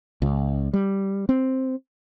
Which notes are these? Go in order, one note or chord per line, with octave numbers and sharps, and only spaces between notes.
C#2
G3
C4